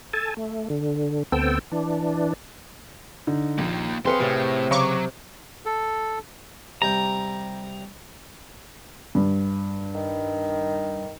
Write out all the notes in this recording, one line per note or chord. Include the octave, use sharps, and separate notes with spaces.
A4 G#5 A5
A3
D3
D2 B3 C4 A4 G5 E6
E3 D4
D3 D#4
A#1 A#2 A#3 D#4
F2 C4 G#4 B4 C5 F5 C6 C#6
A2 C3 C#5
C#3 F#3 C#6 D6
A4
C3 G3 G5 A#5
G2
D#3